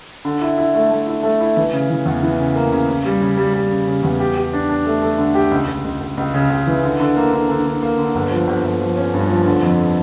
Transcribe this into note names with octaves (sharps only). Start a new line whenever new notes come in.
D3
E4
E4
A3
A3
E4
A3
E4
E3
C#3
E3
E2
E3
C#3
A#3
C#3
C#3
G3
C#3
G3
G3
C#3
C#3
E2
G4
G4
D4
D4
A3
A3
D3
G4
C#2
C#2
C#2
C#2
C#2
C#3
C#2
E3
D3
D3
A#3
D3
D3
D3
A#3
D3
G1
F3
G1
G1
F3
C#4
G2
F3
D3
F2